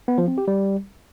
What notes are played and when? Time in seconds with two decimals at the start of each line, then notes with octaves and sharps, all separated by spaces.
0.08 B3
0.18 F3
0.28 C4
0.38 G4
0.48 G3